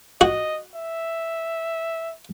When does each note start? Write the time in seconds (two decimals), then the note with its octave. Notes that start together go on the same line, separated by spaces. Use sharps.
0.21 F#4 D#5
0.74 E5